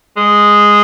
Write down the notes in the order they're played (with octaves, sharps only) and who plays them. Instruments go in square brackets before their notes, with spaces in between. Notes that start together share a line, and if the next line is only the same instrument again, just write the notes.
[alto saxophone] G#3